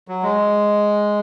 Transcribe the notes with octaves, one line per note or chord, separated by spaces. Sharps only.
F#3
G#3